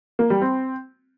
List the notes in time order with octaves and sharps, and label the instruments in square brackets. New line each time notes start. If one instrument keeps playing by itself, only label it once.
[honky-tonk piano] A#3
G3
C4